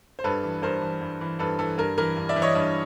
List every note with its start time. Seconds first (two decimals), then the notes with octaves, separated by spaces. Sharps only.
0.19 C5
0.24 G2 A4 B4
0.43 E3
0.62 G2 A#4 C5
0.82 E3
1.01 G2
1.21 E3
1.39 G2 A4 B4
1.59 E3 A4
1.78 G2 A#4
1.98 E3 A#4
2.17 G2
2.29 D5 E5
2.36 E3
2.42 C#5 D#5
2.55 G2